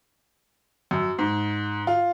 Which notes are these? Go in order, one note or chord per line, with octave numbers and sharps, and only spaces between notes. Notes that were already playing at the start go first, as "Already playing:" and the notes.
F#2
G#2
F4